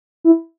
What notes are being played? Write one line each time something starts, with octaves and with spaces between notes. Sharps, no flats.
E4